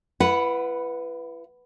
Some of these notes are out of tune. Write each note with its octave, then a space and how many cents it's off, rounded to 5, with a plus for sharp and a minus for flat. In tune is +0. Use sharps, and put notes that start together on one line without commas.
E4 +40 B4 +0 F#5 +0